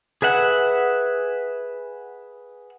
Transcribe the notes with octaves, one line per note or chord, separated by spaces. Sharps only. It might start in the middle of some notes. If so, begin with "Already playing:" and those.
G#4 B4 E5 F#5